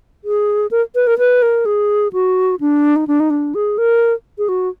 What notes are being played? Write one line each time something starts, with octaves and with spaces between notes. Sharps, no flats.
G#4
A#4
B4
A#4
B4
A#4
G#4
F#4
D4
D#4
D4
D#4
D4
G#4
A#4
G#4
F#4